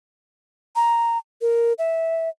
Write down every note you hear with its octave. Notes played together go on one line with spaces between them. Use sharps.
A#5
A#4
E5